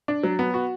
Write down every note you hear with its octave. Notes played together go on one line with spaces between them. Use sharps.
D4
F#3
B3
F#4